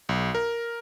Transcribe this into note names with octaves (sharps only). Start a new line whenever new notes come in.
B1
A#4